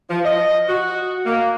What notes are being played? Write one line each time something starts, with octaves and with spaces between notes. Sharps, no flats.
F3
D#5
F#4
A#3